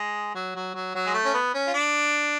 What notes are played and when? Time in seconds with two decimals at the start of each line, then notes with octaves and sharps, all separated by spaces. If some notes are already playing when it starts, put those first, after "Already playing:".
Already playing: G#3
0.35 F#3
0.55 F#3
0.75 F#3
0.95 F#3
1.07 G#3
1.14 A3
1.25 C#4
1.34 B3
1.54 C#4
1.67 F4
1.74 D4